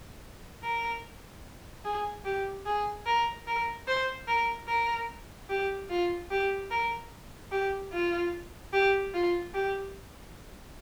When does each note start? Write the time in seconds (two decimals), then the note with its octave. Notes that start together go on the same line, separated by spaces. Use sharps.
0.63 A#4
1.84 G#4
2.25 G4
2.66 G#4
3.06 A#4
3.47 A#4
3.88 C5
4.28 A#4
4.68 A#4
5.50 G4
5.90 F4
6.31 G4
6.71 A#4
7.52 G4
7.92 F4
8.73 G4
9.14 F4
9.54 G4